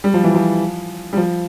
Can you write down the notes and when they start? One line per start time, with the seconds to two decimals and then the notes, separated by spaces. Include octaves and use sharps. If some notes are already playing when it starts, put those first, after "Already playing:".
0.04 G3
0.14 F3
0.24 E3
0.34 F3
1.13 G3
1.17 F3